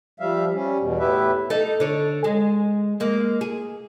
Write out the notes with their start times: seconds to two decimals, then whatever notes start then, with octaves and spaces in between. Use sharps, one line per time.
0.20 F3 G3 E5 F5
0.54 G3 C#4
0.80 E2 B2
0.99 A2 B3 E4 G4 B4 E5
1.50 D#4 A4
1.80 D3 C#5
2.24 G#3
3.00 G#3 A#3
3.41 G#4